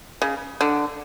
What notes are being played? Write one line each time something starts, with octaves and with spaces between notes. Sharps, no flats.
C#3
D3